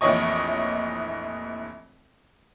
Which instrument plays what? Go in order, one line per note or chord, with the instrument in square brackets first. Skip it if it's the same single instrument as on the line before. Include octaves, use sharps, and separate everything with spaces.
[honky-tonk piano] F1 A#1 E3 C#5 D#5 C#6